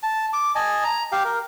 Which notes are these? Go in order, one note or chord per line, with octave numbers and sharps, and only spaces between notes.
A5
D6
D#5 G#5 A5
A#5
G4 F5 G5
A#4